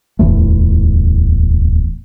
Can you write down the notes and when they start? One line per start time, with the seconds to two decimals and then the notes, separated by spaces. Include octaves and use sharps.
0.19 D1 B1 E2 A3